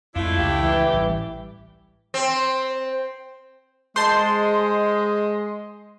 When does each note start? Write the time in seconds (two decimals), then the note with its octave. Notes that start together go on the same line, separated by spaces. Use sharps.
0.16 F2 G#3 A3 D4 E4 F4
0.38 C#2 G4
0.60 E3
0.92 A1 G3
2.14 C4
3.96 G#3 C5 D#5 A5 C6